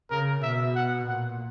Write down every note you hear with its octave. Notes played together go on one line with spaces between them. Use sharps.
C#3 A#4
B2 E5
F#5
A#2 F#5